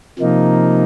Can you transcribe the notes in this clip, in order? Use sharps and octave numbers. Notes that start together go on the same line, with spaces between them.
C3 F3 A#3 D#4